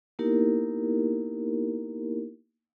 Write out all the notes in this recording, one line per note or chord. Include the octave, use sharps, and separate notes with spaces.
A#3 B3 D#4 E4 G4 A#4